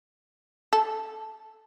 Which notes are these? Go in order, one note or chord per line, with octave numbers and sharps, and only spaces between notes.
A4